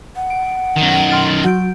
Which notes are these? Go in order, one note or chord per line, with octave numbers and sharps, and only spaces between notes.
F#5
D7
F#2 D#3
C6 F6 A6
F#3 F#4 G6 D7